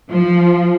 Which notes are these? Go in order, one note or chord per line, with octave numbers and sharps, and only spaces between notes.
F3